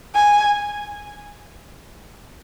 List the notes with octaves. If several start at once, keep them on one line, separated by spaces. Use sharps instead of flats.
G#5